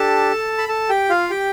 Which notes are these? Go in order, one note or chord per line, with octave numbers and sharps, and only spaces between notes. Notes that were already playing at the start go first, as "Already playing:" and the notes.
Already playing: D4 G4 A4 A5
B5
A4 A5
G4 G5
F4 F5
G4 G5